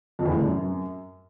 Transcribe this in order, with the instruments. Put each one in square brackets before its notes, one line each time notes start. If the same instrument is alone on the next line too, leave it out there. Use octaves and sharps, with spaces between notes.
[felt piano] F2
E2
A2
C3
F#2